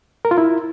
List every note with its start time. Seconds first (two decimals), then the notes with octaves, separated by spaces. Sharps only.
0.25 A#4
0.31 F4
0.38 E4